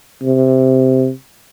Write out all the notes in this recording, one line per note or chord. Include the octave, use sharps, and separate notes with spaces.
C3